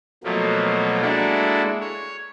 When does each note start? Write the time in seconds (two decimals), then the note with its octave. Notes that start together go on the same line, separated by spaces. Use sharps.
0.24 B2 F3 F#3 A3 A#3
1.01 G#3 A#3 D4 E4 F#4 A4
1.81 C#5